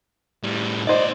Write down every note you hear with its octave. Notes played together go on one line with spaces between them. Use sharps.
A2 G3
B3 D#4 C5 D5